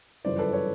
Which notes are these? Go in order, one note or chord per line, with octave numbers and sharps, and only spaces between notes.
G1 F#2 C#3 E3 C5 D5
A4 B4
B4 C#5